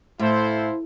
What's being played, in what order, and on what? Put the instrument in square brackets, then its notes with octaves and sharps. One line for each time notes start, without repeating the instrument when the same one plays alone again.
[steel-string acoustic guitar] A2 [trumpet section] E4 A4 C5 F5